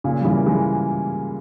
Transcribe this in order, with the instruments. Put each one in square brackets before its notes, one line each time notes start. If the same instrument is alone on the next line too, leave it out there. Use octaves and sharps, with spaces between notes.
[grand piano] A#2 C#3
G3
C#3 E3
A#3
E3 G#3